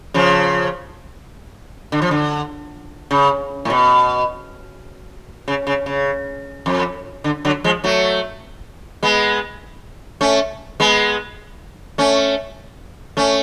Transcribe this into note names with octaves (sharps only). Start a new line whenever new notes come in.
C#3 F3
D3
F3
D3
C#3
A2
B2
C#3
C#3
C#3
F2
D3
D3 F#3
F3 G#3
F#3 A3
G#3 B3
A3 C#4
G#3 B3
A3 C#4
A3 C#4